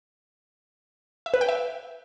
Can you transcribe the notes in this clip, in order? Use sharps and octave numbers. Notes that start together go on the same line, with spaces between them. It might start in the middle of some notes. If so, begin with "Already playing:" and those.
E5
B4
G5
E5